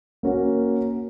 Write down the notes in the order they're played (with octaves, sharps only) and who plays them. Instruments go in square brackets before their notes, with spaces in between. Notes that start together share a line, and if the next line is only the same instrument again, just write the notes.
[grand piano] A#3 C#4 F#4 A#4